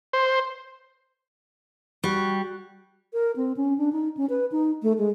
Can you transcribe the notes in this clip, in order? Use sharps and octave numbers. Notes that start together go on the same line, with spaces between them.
C5
G3 F#4
A#4
C4
C#4
D4
D#4
C#4
B4
D#4
A3
G#3